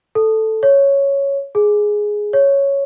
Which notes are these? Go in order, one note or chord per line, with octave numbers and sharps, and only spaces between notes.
A4
C#5
G#4
C#5